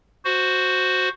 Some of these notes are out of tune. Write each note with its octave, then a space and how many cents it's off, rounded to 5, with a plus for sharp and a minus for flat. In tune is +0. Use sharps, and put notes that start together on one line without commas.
F#4 +0 C5 +0